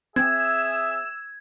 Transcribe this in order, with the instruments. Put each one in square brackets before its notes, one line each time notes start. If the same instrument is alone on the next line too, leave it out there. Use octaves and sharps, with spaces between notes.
[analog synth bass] C4 [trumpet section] G#4 E5 [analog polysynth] E6 [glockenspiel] G#6